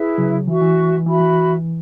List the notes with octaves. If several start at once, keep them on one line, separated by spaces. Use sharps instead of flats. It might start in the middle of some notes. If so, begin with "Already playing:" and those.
Already playing: E4 G#4 B4 E5
C#3 F#3
E3 F#4 E5 C#6
E3
E3 F#4 E5 B5
E3